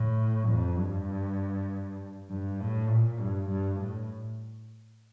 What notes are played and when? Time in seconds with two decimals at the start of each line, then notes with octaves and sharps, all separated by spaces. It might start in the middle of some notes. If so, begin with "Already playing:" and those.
Already playing: A2
0.49 F2
0.79 G2
2.30 G2
2.60 A2
2.90 A#2
3.20 G2
3.50 G2
3.81 A2